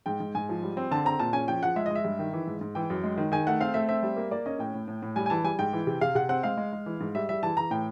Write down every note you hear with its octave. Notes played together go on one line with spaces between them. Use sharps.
G#2 G5
G#2
G#2 G#5
F3
G3
C4
D3 A5
C4 A#5
A#2 A5
C#4 G#5
F3 G5
F3 F#5
G#3 E5
D#5
G#3 E5
G2
D#3
E3
G#2
G#2
E3 G5
F#2
G#3
D#3
D#3 G#5
A3 F#5
C4 F5
A3 E5
C4 E5
G3
A#3
A#3 D5
C#4 D#5
A2 G5
A2
A2
A2
G3 G#5
G#5
E3 A5
G3 G#5
G#2 G5
E3
C3
C3 F5
C3 F#5
C4 F#5
G#3 F5
G#3
G#3
E3
G#2
G3 E5
G3 E5
E3 A5
E3 A#5
A2 G5